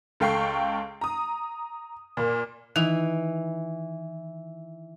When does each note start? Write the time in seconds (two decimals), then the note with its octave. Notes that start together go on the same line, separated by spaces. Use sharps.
0.20 C#2 A4 F5 G5 C#6 C7
1.01 A#5 D#6
2.17 A#2 A#3
2.76 D#3 E3 D#4